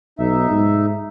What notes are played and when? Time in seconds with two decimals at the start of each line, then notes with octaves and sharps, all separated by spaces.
0.19 B1 D#4 E5
0.51 G#2